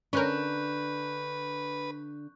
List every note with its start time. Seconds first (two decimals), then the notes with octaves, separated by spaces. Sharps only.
0.13 D3 C#4 D4 A#4 B4 C#6 F#6 G6